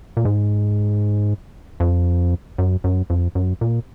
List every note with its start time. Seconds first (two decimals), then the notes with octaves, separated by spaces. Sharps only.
0.17 A#2
0.25 G#2
1.80 F2
2.58 F#2
2.84 F#2
3.10 F2
3.35 F#2
3.61 A#2